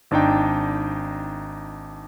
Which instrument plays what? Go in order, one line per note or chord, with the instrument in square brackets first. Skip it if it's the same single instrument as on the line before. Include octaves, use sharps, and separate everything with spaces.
[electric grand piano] G#1 D4 D#4 G5